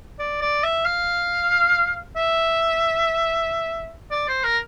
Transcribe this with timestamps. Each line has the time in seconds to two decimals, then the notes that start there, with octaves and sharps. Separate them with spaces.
0.19 D5
0.41 D5
0.64 E5
0.86 F5
2.16 E5
4.11 D5
4.28 C5
4.44 A#4